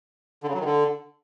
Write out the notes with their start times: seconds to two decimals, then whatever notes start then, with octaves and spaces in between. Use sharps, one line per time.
0.43 D3
0.49 C#3
0.54 F#3
0.59 D#3
0.65 D3